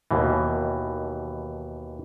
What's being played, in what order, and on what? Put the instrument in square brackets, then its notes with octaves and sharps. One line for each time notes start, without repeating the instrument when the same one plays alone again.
[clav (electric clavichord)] D#2 B2 E3